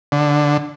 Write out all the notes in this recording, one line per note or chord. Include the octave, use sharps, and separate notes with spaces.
D3